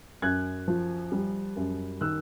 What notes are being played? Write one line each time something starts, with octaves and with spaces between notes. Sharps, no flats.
F#2 F#6 G#6
F3
G3
F#2
D#3 E6 F#6